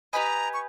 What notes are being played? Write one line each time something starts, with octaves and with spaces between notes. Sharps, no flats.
G4 B4 D#5 G#5 A#5 B5
C#6